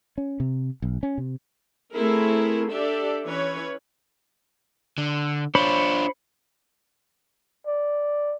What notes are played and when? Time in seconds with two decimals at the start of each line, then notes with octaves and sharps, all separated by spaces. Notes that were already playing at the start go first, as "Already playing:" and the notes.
0.18 C#4
0.40 C3
0.82 B1
1.03 C#4
1.18 C3
1.94 A3 C4 E4 G#4 A#4
2.71 D4 G4 A4 D5 E5
3.26 E3 C#4 B4 C#5
4.98 D3
5.55 D4 F4 C5 C#5 B5
7.67 D5